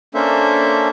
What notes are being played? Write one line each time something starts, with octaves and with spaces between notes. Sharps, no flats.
A#3 C#4 D4 A4 C5 E5